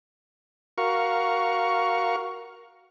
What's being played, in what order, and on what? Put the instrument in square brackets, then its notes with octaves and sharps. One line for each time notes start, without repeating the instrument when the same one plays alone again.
[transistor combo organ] F#4 A#4 F5 C#6